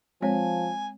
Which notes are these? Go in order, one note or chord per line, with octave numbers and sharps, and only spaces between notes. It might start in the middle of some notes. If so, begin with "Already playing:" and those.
F3 G#3 C4 C#5 G#5